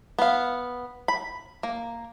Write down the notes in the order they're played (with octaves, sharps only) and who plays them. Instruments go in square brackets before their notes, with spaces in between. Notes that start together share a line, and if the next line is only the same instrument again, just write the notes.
[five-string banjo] B3 F5
B5
A#3